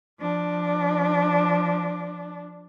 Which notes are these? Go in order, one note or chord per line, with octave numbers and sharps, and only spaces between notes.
F3 D4